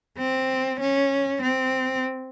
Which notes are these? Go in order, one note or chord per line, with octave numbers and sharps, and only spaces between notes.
C4
C#4
C4